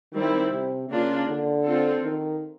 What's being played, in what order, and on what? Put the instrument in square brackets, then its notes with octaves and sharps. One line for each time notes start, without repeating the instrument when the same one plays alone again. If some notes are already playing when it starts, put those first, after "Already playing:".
[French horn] D#3 [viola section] G3 C4 E4
[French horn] C3
[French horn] C#3 [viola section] A#3 D4 F4
[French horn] D3
[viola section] C4 F4 A4
[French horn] D#3